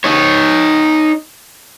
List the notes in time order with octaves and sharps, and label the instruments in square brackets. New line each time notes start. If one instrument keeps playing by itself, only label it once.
[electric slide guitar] D#4 C#5